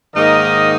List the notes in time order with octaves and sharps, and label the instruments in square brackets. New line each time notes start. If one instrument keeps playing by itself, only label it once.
[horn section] G#2 D#3 A#3 D#4 A#4 D#5